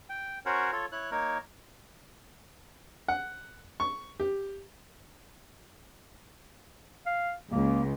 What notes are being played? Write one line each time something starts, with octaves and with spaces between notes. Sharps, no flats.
G5
C#4 F#4 A#4 C5 C#5 F#5
F4 A4 C#5
E4 C#5 F#6
A#3 D#4 A#4 C#5
F#5
C#6
G4
F5
C#2 A#3